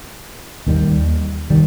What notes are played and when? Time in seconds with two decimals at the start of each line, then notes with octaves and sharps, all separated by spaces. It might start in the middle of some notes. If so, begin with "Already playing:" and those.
0.67 D#2 D#3 G3
1.50 D#3 G3